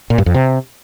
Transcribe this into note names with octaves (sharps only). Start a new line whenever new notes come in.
A#2
G2
F2
C3